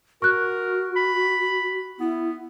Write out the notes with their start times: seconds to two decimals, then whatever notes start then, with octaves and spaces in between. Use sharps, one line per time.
0.22 F#4 A#4 C#6 F#6
0.96 B5
2.00 B3 E4